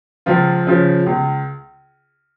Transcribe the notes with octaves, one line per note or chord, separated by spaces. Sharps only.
C#2 F3 F4
C#3 F3
C#2